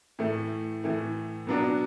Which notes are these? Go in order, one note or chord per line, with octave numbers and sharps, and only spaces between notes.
A2 E3 A3
A2 E3 A3
B2 F#3 B3 D4 F#4